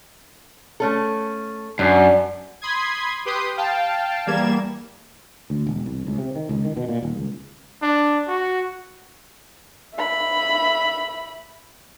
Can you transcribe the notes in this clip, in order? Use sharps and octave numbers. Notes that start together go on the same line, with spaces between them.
A3 C#4 A4
F#2 D4
B5 C6 D#6 G#6
G4 B4 C6 D#6 G6
F5 G5 A5
E2 G3 A#3 G#6 E7
D2
E1
C2
C#2
C3
D#3
C#2
D#3
B2
A#2
D#1
C#2
D4
F#4
E5 B5